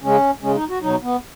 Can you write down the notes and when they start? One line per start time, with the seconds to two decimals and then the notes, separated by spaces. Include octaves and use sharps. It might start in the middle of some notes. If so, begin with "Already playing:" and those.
0.03 C#3 G#3 C#4
0.42 C#3 G#3 C#4
0.55 D#4
0.69 F#4
0.82 B2 F#3 D#4
1.03 B3